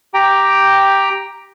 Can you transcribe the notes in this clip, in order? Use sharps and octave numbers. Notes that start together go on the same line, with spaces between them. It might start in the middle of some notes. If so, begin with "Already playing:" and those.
G4 G5 A#5